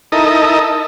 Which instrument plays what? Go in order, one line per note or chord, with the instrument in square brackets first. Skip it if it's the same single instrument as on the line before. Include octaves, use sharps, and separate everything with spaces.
[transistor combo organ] D#4 E4 A4 A#4 D#5